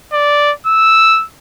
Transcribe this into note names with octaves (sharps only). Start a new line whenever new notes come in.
D5
E6